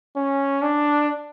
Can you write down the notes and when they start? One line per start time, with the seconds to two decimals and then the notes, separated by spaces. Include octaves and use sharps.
0.16 C#4
0.62 D4